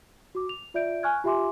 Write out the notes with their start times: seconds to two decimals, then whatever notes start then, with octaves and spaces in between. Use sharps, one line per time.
0.35 F#4 D6
0.49 F7
0.74 F4 D5 E5 G6 D7
1.03 G#5 C#6 F6 F#6 G#6
1.24 F4 G4 E5 G#5 C6 D6